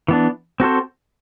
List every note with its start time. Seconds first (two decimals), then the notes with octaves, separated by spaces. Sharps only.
0.08 E3 B3 D4
0.60 C4 F#4 A4 C5